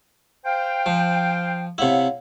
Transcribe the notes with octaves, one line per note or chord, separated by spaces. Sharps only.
C5 F5 G5
F3
C3 E4 C#5 F5 F#5